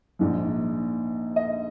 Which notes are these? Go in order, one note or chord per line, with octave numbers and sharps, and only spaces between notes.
A#1 G#2 F3
D#5